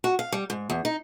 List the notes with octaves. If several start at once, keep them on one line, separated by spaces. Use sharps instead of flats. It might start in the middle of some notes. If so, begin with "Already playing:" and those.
F#4
F5
G3
G#2
E2
D#4